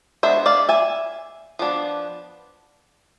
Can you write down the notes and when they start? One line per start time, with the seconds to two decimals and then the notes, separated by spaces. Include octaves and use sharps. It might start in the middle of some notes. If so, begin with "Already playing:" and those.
0.23 G#3 B3 D4 C5 E5
0.46 D5 F5
0.69 E5 G#5
1.59 F3 B3 D4